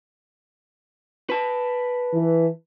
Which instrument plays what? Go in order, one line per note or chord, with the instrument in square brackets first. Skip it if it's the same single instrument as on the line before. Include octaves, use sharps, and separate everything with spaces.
[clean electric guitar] B4 A5
[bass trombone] E3